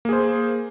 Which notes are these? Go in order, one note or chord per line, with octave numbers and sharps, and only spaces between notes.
A#3 G#4 C5